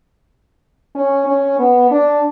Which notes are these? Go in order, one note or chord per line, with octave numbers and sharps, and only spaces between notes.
C#4
C#4
B3
D4